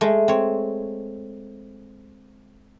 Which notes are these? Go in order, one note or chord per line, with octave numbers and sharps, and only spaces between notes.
G#3 A3
C4 C#5